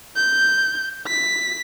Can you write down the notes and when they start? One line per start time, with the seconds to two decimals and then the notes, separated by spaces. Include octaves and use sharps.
0.16 G6
1.07 B6